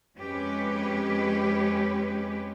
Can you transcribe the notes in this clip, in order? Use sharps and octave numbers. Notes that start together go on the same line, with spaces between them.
F2 G#3 C#4 G4 B4